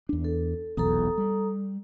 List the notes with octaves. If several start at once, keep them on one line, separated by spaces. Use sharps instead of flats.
E2 D4
A4
F1 B1 E2 A4 A#5 D#6
G3